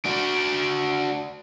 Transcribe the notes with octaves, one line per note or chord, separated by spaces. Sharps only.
D4 F#4